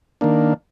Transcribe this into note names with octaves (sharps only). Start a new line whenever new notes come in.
D#3 A#3 D4